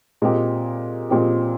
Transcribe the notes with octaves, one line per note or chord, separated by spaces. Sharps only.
A#2 G#3 C4 G4
A#2 G#3 C4 G4